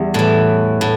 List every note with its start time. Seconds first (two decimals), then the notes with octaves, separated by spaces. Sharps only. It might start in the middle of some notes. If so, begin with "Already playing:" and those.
Already playing: E2 G3
0.14 A2 E3
0.81 A2